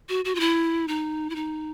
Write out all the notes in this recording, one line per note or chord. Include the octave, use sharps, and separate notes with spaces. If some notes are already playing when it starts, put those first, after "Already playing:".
F#4
F#4
F4
E4
D#4
E4
D#4